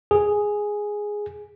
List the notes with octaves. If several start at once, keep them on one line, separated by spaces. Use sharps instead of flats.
G#4